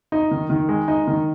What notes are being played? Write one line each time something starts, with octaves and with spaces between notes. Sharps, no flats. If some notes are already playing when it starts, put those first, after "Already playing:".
D#4
D#3
D#3
G#3
D#4
D#3